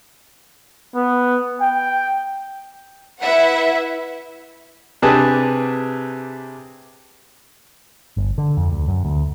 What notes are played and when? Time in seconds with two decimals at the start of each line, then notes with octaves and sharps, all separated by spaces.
0.96 B3
1.61 G5
3.21 E4 B4 E5 F#5
5.02 C3 D4 G4 G#4 B4 A5
8.17 G1
8.38 D3
8.57 F2
8.72 D2
8.88 F#2
9.05 D2